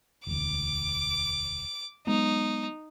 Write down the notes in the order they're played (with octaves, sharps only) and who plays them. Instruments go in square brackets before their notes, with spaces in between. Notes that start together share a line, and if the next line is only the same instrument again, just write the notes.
[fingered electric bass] E1 D2 [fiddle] D6
[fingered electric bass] F#3 G#3 B3 [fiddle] D#4